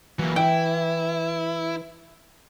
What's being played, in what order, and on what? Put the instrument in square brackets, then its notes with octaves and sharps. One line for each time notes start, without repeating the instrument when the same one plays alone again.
[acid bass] E3 [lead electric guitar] F#3 A#3
[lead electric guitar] E4 [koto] G5